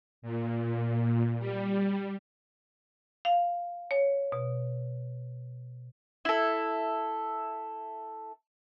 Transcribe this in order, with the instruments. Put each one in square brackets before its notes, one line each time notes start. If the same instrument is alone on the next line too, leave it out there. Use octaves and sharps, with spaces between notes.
[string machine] A#2
G3
[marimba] F5
C#5
B2
[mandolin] E4 A4